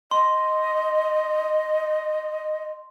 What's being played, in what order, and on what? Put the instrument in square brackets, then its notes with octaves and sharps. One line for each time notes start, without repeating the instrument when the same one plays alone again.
[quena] D#5 [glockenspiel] C6